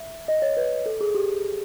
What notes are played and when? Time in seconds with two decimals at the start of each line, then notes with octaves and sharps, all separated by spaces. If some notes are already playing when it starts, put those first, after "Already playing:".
Already playing: E5
0.28 D#5
0.42 C#5
0.57 B4
0.86 A4
1.01 G#4
1.14 G4